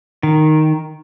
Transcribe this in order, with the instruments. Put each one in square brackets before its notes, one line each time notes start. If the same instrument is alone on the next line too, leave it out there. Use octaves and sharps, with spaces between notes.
[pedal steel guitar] D#3